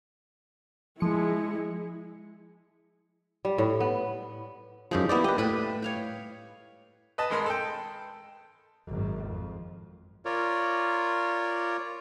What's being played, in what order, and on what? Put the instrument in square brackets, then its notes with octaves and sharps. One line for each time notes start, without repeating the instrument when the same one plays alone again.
[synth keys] F3 C#7 [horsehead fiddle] G#3 E4
[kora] G3
A2
B3
[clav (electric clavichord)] F#2 F3 [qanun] G#3 D#4 G4
[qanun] G3 A#3 E4 [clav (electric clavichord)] B3 D5
[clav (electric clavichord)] G4 B4 [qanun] D#5
[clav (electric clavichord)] A2 [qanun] B4 A5 B5
[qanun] C#5 F5 G5
[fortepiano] B4 D#5 A5
G#1 G#3 A#4 B5 C6
A4 G5
[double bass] G#1 F#2
F2
[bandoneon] F4 A#4 C#5 D5